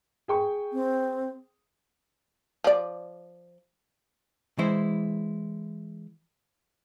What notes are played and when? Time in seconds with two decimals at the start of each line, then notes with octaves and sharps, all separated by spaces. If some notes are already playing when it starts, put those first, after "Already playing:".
0.28 G#4 G5 C#6
0.73 C4
2.64 F3 D5
4.58 E3 G#3 E4 C5